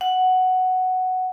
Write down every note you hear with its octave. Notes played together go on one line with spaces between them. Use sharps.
F#5